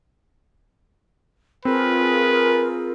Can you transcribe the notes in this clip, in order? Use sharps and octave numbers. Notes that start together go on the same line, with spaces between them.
C4 F4 G#4 A#4 B4